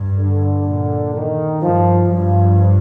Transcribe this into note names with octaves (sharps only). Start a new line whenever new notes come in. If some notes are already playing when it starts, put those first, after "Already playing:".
Already playing: G2
D3
A#2
D#3
G2 F3
G2 F3